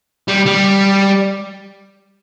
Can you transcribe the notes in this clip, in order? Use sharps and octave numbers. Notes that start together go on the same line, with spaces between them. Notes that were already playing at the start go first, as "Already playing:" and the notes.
G3
G3